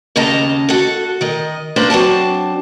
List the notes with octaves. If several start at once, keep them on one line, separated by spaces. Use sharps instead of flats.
D#2 C#3 D#5 A5 A#5
F#4 A4
D#3 D#5
A#3 C4 D4 B4 C5
F#3 C4 D4 A5